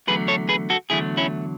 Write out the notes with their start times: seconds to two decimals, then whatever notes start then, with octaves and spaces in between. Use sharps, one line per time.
0.07 E2 D3 F#3 A3 G#4 B4
0.28 A4 C#5
0.49 G#4 B4
0.70 F#4 A4
0.90 E2 D3 F#3 A3 E4 G#4
1.17 C#4 E4